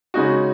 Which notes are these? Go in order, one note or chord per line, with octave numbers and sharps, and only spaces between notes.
C#3 G#3 D#4 F#4